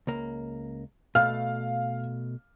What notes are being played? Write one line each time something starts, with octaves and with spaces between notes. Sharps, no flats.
C#2 A#3
B2 A3 F5 F6